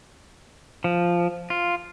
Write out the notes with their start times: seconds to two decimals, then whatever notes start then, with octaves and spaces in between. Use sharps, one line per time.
0.84 F3
1.50 F4